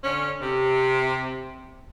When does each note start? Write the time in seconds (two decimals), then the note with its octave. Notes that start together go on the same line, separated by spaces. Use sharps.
0.04 D3 C#4
0.42 C3